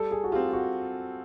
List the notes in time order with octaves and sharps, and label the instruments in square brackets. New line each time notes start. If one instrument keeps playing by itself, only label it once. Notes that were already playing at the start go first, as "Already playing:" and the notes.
Already playing: [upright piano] G3 [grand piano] A4
[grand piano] G#4
F#4
[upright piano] C4 F4 [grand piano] G4
[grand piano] F#4